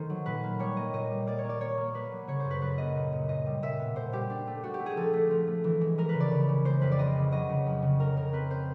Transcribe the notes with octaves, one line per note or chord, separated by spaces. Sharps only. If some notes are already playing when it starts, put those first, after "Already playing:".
Already playing: D#3 A3 C5
F#3
A#2 B4
A#3
G3 C#5
A#3 D#5
A#2 D#5
G3
A#3 D5
C#5
A#3
D5
A#3 C#5
A#3
A#3 B4
F#3
C#3 C#5
F#2 C5
B4
F#2 B4
A#3 D#5
A#2
A#2
A#2 D#5
G3
A#2 E5
B3
A#2 C5
G3 G4
D4
A3
D4 F#4
G4
A3
G#4
F3 A4
A3
F3
A3
E3
G#3
G#3 A#4
B4
C#3
D5
C#3
C#3
G#3 C5
F2 B4
D5
F2 D#5
C#3
F#3 D#5
C#3
F2
C#3
F2 A#4
C#3 A#4
C4 B4
C5